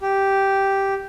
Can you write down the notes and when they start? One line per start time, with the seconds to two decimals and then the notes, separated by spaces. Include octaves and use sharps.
0.01 G4